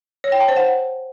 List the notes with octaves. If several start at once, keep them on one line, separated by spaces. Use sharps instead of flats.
C#5
G5
A5
C5
F#5